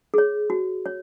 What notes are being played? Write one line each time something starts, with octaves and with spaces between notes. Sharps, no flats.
G#4 C#5
F#4
C#5